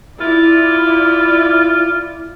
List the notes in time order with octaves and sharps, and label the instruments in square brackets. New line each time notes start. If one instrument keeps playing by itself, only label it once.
[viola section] E4 D5 [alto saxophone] F4